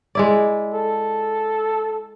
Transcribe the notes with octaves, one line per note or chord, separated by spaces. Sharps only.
G#3 E4 D5
A4